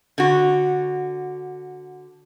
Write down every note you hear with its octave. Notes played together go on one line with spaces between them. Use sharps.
D3 F#4